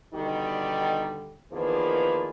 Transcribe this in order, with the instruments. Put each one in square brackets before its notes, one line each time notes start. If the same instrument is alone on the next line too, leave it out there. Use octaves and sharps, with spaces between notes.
[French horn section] B2 D3 D#3 G3 D#4 G4
E2 D#3 F3 A#3 G#4 B4